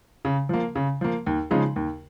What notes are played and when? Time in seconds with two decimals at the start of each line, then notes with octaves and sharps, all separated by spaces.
0.25 C#3
0.49 F3 A#3
0.75 C#3
1.01 F3 A#3
1.26 D#2
1.51 C#3 F3 G#3 D#4
1.76 D#2